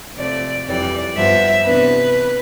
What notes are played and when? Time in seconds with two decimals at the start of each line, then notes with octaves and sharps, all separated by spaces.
0.18 C3 F3 A3 D5
0.67 F2 E3 G3 D5
1.17 G2 F3 B3 E5
1.66 C3 E3 B3 D4 B4